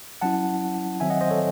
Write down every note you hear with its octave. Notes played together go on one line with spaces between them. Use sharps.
F#3 C#4 E4 F#5 A5
D#3 F#3 C4 E5 G#5
D#5 F#5
C5 D#5
A4 C#5